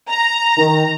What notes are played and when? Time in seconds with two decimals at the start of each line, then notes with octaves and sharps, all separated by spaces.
0.10 A#5
0.58 D#3